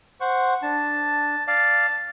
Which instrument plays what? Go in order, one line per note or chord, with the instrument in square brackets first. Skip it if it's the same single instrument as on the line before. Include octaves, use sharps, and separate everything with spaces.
[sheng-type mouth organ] C5 F#5 C#6
[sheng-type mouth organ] D4 [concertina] A5
[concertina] D5 F5 [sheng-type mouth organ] A5